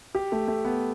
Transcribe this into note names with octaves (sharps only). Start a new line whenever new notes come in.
G4
A3
A3
B3